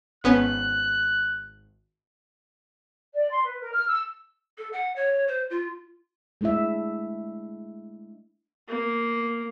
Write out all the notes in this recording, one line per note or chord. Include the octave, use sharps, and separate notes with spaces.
G#1 B3 C#4 F#6
D5
C6
B4
A#4
F6
E6
A4
F#5
C#5
C5
F4
G#3 A3 D4 E4 E5
A#3